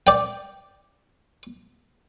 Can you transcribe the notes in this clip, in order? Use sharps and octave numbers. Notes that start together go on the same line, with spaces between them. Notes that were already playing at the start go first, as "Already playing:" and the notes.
D5 G5